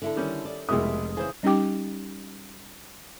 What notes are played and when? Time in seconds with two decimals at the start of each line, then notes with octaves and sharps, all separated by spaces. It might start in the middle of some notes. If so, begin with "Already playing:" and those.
0.02 D3 E4 A4
0.16 D#3 G3 C#4
0.45 D5
0.69 F1 C2 B2 G#3 E4 A#4 D#6
1.17 C#3 E3 G#4 C5
1.43 G3 C#4 D#4 G4 G5 D6